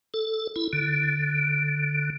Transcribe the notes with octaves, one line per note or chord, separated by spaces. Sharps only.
A4
E4
D3